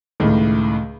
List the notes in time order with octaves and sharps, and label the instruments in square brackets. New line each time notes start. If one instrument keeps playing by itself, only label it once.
[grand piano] C#2 A2 D#3